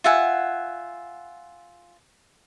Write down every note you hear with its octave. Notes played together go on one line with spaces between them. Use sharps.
F4 E5 F#5 G#5